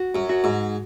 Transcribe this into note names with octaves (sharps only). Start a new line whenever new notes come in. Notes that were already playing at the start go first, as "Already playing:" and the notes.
Already playing: F#4
F#2
F#4
G#2